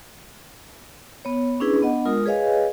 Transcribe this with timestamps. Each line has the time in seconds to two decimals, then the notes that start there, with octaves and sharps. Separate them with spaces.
1.25 B3 C#5
1.60 C#4 D4 E4 G#4 B4
1.82 B3 D4 D#5 F#5
2.06 G#3 F4 A#4 D#6
2.26 G#4 B4 C#5 D#5 F5 G#5